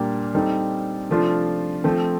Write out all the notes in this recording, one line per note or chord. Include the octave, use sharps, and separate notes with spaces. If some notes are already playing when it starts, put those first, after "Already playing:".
Already playing: A#2 G3 A#3 D4 G4
G3 C4 D#4 A4
C3 F3 A3 D4 F4
F3 A3 C4